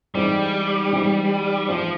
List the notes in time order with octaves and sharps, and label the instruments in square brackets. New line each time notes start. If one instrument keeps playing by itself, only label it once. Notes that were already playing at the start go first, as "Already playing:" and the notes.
[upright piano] G#2 E3 G#3 C4 [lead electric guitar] G3
[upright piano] G#2 E3 G#3 C4
[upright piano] G#2 E3 G#3 C4 [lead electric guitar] F3